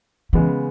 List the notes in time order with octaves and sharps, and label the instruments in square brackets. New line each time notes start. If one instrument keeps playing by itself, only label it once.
[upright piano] C#3 G#3 B3 [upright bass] E3